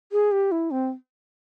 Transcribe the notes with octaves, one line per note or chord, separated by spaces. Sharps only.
G#4
G4
E4
C4